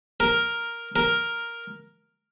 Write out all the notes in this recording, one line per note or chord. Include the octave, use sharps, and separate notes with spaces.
A#4
A#4